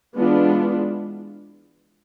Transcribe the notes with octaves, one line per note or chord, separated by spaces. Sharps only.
E3 G#3 B3 D4 F4